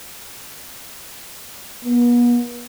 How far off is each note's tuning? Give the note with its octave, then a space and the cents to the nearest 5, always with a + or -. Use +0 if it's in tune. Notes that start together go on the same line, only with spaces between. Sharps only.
B3 -40